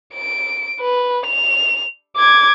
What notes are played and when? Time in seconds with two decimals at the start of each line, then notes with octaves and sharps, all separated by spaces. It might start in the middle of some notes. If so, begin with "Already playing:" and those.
0.15 D7
0.80 B4
1.26 F7
2.16 D6 G#6